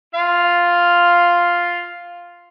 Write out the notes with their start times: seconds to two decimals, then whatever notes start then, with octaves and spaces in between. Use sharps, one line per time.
0.15 F4 F5